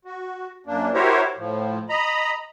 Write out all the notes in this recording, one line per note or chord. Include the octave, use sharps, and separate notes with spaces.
F#4
F#2 A#3 D4
E4 F#4 G4 A#4 C5 C#5
A2 F3
D#5 A#5 B5